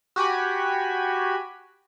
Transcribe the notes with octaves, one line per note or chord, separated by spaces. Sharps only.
F#4 G4 G#5 B5